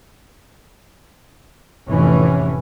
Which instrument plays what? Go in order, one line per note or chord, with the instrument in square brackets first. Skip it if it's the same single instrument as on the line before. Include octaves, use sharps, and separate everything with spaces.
[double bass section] F1 A2 E3 C#4